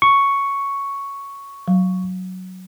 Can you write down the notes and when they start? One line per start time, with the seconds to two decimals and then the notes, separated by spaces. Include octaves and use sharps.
0.02 C#6
1.68 F#3